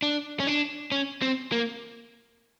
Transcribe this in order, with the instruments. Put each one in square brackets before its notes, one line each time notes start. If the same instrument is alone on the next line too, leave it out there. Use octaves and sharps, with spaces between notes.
[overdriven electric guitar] D4
C#4
D4
C#4
C4
A#3